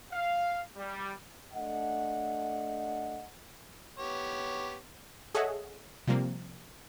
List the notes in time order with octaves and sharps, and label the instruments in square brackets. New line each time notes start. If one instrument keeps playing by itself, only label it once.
[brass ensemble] F5
G3
A3 D4 D#5 F#5
[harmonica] B3 G4 C#5
[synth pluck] G#4 A4 C#5 D#5 E5 F#5
C3 F3 G3 A#3 C4